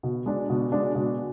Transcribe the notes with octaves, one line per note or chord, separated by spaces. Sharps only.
B2
G#3 D4
B2
G#3 D4
B2